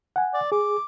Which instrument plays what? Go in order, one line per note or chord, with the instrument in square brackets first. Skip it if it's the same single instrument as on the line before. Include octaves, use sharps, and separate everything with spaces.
[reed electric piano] F#5 G#5
[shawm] D5
[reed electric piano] G#4 [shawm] D6